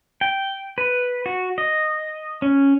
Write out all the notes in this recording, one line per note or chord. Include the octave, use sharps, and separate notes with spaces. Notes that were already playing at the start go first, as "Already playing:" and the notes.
G5
B4
F#4
D#5
C#4